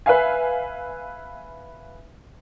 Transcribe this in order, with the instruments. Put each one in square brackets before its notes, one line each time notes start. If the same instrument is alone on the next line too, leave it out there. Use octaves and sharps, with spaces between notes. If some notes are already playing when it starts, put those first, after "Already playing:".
[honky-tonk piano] B4 E5 F5 G#5